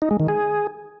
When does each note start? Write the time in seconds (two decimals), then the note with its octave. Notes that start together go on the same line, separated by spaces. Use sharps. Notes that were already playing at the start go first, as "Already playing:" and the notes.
0.02 D#4
0.11 G#3
0.20 D#3
0.28 G#4